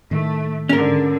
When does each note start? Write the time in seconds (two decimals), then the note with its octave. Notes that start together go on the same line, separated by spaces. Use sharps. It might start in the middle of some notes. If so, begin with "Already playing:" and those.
0.11 A2 D#3 A3
0.69 G#2 D3 C#4 A#4